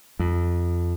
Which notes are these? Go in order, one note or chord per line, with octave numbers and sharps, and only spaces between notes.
F2